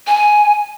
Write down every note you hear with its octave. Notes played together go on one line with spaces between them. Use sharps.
G#5